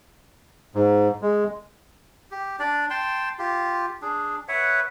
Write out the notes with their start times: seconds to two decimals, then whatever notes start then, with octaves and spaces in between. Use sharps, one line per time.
0.75 G#2
1.22 G#3
2.31 G4
2.59 D4 D5
2.90 G5 A5 C6
3.39 F4 G4
4.02 D4 G#4
4.48 B4 C#5 E5 F#5